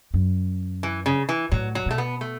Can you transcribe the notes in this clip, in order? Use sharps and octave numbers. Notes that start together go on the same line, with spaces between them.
F#2
E3
C#3
E3
A2 F#3
F#3
B2 A3
B3
A3